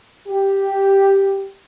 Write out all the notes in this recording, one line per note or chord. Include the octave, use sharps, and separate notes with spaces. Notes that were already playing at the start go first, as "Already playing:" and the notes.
G4